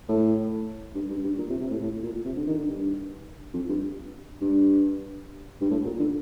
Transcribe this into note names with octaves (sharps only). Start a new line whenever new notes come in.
A2
G2
G2
G2
A#2
C3
C3
A2
A2
A#2
C3
D3
D#3
D3
G2
F2
G2
G2
G2
A2
A#2
D3